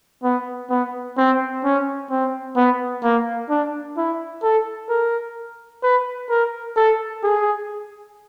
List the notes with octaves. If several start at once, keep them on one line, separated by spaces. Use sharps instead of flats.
B3
B3
C4
C#4
C4
B3
A#3
D4
E4
A4
A#4
B4
A#4
A4
G#4